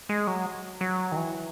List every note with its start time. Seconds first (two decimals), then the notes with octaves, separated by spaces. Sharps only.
0.09 G#3
0.27 F#3
0.81 F#3
1.12 D#3
1.16 E3